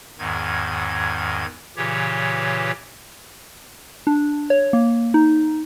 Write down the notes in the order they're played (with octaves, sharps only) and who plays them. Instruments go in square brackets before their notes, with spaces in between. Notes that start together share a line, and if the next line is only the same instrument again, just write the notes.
[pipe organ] E2 G#2 D#3 G#6
A#2 C#3 E3 G4 C#5
[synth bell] D4
C#5
A#3
D#4